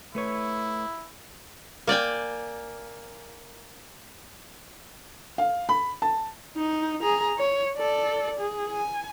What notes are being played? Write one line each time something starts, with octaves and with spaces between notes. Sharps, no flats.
A3 E4 B4 C#5
A#3 D5 G5 G#5
F5
B5
A5
D#4
G#4 A#5
C#5
A4 D5
G#4
G#5